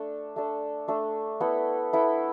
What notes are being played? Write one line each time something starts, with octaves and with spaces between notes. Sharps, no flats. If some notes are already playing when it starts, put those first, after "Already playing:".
Already playing: A3 D4 A4
A3 D4 A4
A3 D4 A4
B3 E4 A4
B3 E4 A4